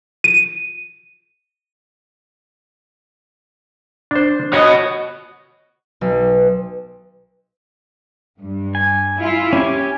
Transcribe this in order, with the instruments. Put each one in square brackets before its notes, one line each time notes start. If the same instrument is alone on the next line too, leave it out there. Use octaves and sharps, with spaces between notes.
[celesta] D#7
[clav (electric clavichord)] D4 C5
[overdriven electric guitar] F#4 D#5 [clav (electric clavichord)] C#5
[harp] B1
[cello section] G2
[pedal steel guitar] G#5
[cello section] E4 F4
[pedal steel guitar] C#4 G#5 [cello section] G4